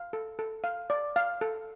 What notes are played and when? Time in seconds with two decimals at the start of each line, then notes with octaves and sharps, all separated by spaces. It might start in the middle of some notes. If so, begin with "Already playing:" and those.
Already playing: F5
0.13 A4
0.39 A4
0.64 F5
0.90 D5
1.16 F5
1.41 A4